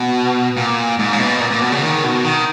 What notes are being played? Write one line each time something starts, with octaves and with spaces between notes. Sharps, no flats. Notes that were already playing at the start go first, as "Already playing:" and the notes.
Already playing: B2
A#2
G#2
C#3
B2
A#2
A#2
B2
C#3
D#3
B2
D#3